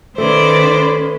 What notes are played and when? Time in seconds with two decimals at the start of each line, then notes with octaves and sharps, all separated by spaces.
0.18 D#3 A3 C#4 B4 C5 D5